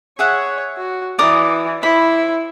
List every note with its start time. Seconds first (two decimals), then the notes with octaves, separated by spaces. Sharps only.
0.19 G#4 C#5 E5 F#5
0.78 F#4
1.19 E3 D5 A#5 D#6
1.83 E4 C5 B5